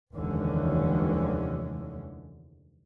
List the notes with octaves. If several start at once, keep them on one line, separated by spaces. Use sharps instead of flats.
F1 D#2 D3 E3 G#3 C#4